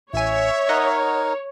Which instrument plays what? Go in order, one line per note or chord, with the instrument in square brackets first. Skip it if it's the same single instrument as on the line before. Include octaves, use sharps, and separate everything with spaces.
[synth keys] A1 G#5 [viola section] C#5 [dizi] E5
[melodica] D#4 A#4 [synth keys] D#5 F#5